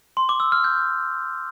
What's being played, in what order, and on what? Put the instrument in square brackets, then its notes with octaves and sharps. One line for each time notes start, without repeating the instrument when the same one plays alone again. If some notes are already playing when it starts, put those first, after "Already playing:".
[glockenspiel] C6
D6
E6
F6
G6